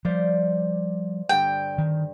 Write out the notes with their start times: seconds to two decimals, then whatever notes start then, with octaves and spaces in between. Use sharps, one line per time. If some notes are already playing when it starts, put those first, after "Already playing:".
0.05 F3 G3 C5 D5 F5
1.29 G2 D3 G5
1.78 D#3